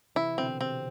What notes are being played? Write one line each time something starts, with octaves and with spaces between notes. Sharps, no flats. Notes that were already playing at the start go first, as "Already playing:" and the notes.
C3 E3 E4
B2 D3 C4
C3 C4